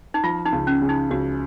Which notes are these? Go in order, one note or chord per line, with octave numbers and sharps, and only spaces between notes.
D#4
F3 F4
D#4
C#2
C#4
C#3
D#4
C#2 F#4